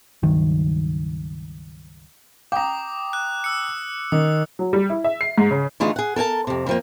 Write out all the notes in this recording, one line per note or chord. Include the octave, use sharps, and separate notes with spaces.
C#2 G2 D#3 F#3
G5 A#5 D6 D#6
F#6
E6 C#7
D#3 D#6
F#3
G3
E4
E5
C7
G#2
C#3
D3 E3 A3 D#4 F4 G#4
G#4 F#5
A4 A#4 G#5 A5
F2 C3
F2 F3 A#3